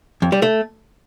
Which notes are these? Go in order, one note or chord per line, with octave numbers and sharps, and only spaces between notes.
F2
G3
A3